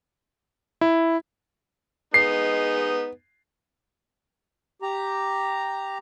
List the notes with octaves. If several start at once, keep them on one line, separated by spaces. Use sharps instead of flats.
E4
G#3 B3 D#4 C7
G4 A#5